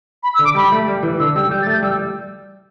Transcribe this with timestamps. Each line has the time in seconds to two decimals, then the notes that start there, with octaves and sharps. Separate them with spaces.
0.23 B5
0.34 E6
0.39 D3
0.45 D6
0.55 G3 B5
0.72 A3
0.88 G3
1.03 E3
1.19 D3 E6
1.35 G3 E6
1.51 G3 G6
1.62 A6
1.67 A3
1.73 G6
1.83 G3 E6